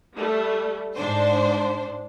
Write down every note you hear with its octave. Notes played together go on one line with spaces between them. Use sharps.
G3 A3
G#2 D4 C5